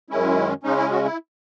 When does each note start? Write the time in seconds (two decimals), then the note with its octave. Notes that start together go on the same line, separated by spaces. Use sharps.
0.10 F#2 D#3 G#3 C#4 E4
0.63 C#3 G#3 C#4 D#4
0.78 E4
0.91 F#4
1.04 E4